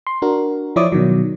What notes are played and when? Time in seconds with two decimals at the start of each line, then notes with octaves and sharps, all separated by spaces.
0.07 C6
0.22 D4 F#4 A#4
0.76 F3 E4 C#5 D5 D6 D#6
0.92 B2 D#3 F#3